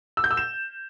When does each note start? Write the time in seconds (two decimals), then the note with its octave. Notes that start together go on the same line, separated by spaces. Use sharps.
0.17 E6
0.24 G6
0.31 E6
0.37 E7